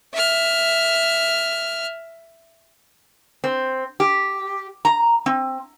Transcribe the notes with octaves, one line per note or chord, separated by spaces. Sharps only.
E5 F6
C4
G4
A#5
C4